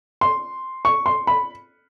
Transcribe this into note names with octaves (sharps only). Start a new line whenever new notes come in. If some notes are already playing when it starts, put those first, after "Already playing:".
C6
C#6
C6
B5